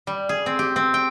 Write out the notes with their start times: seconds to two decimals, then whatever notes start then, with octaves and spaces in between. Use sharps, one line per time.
0.07 G3
0.29 G#4
0.46 C4
0.59 G4
0.76 C4
0.94 G5